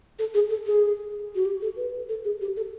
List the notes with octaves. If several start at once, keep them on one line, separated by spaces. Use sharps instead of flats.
A4
G#4
A4
G#4
F#4
G4
A4
B4
A4
G#4
G4
A4